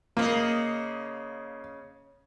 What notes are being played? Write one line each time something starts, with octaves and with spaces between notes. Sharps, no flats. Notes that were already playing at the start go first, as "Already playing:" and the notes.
C#3 A#3 B4 D#5